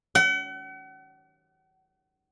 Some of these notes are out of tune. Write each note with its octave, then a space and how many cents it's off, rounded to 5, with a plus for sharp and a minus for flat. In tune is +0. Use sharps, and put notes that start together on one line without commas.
F#5 +40